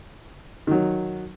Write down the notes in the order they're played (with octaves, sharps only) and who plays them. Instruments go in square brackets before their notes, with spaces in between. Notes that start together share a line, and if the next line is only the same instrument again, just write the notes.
[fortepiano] D#3 F#3